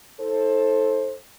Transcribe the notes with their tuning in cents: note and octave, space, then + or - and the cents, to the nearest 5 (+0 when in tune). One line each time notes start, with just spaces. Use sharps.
D#4 +40 A4 +0 C5 +25